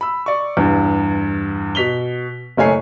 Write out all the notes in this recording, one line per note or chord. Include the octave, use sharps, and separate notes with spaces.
B5 E6
D5 C#6
E2 G2
B2 B6 F7 G7
F#1 A3 C#5 G#5 C7